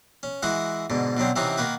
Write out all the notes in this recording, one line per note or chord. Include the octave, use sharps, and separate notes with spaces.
C#4
E3 G#3 E4 F#4 F#5
G#2 B2 D3
B2 D3 F#3 C4
C3 E3 C4 C#4 D#4 F#4
D#3 A#3 F#4 B4